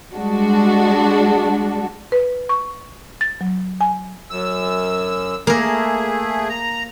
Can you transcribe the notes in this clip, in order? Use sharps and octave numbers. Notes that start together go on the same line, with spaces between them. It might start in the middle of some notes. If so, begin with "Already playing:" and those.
G3 G#3 D4 F#4
B4
C#6
A6
F#3
G#5
F#2 E6
A3 A#3 G#4 A#4
A#5